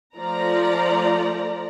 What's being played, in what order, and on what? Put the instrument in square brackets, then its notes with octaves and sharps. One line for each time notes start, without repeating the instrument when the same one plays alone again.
[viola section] F3 A3 D5 A#5